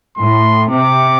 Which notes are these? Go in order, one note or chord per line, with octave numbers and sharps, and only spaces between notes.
A2 C6
C3 D6